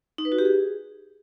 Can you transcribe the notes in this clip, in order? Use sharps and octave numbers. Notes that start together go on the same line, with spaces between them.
D#4
B4
F#4
G4
G#4